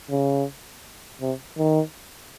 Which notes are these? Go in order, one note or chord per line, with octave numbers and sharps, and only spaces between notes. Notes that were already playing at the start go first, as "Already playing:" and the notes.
C#3
C3
D#3